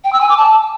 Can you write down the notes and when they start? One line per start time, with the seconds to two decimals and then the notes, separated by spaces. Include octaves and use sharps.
0.04 G5
0.12 E6
0.21 G#5
0.29 D6
0.37 A5